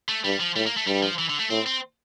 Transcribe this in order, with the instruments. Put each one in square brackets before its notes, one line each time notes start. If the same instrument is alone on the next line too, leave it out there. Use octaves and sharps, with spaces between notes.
[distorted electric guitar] A3
[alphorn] G2 [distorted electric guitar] G3
[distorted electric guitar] F3
[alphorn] A2 [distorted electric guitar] G3
[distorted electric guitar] A#3
A3
[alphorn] G2 [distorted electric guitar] G3
[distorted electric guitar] F3
E3
D3
A3
[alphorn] A2 [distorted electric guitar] C4
[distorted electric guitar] C4